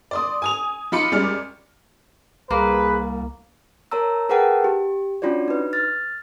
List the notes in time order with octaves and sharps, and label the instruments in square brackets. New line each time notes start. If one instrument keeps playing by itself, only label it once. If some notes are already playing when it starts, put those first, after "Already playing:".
[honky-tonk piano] D5 C6 D#6
G#5 D#6 F7
F#3 D#4 F4 B5 D6 C#7
F#2 G3 G#3 C#4 D5 F6
[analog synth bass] C2 [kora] A#3 [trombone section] G#4 B4
[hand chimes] A#4 C#5 A5 A#5 E6
G#4 A#4 B4 F#5 G5 A5
G4
C#4 D4 F4 F#4 C#5 D5
D#4 B4
F6 A6